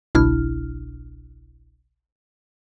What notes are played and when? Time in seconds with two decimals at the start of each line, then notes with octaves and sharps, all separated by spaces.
0.15 G1 C2 B2 D4 E4 F6